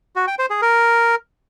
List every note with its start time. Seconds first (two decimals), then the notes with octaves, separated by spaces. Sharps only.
0.16 F#4
0.27 G5
0.39 C5
0.50 G#4
0.62 A#4